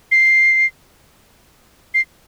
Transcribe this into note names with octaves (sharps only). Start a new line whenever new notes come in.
C7
C7